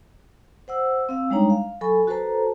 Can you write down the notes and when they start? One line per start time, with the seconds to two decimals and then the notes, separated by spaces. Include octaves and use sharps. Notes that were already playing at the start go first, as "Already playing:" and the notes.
0.68 C5 F#5 E6
1.09 C4 F5 E6
1.30 G3 G#3 D4 D#4 C#5 A#5
1.50 F5
1.81 F#3 A4 G#5 B5 C#6
2.07 F#4 A4 B4 C5 A5 A#5